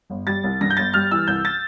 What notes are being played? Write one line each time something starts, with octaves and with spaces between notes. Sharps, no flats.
G1
G3 A6
C2
G2 A#6
G6
G1 A6
G3 F6
E3 E6
C2 G6
A6